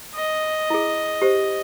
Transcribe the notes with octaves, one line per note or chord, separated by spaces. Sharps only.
D#5
E4 G#4
G4 C5